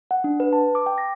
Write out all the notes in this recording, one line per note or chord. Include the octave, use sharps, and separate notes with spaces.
F#5
D4
B4
A5
D6
G5
A#6